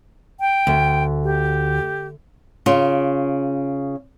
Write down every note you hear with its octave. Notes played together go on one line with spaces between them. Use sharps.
G5
D2
G4
C#3 F4